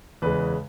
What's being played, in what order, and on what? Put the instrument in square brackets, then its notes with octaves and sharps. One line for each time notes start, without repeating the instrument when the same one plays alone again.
[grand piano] E2 C#3 G#3 B4